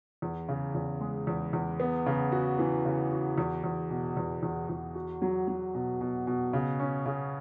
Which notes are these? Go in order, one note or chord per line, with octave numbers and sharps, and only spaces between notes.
E2
C#3
E2
G#3
E2
E2
B3
C#3
F#4
E3
C#3
F#4
E2
E2
B2
E2
E2
E2
F#4
F#3
F#3
B2
B2
B2
C#3
C#4
C#3